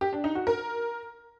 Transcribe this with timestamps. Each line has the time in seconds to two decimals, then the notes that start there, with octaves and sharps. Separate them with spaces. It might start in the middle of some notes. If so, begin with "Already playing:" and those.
0.01 G4
0.13 D4
0.24 D#4
0.35 F#4
0.47 A#4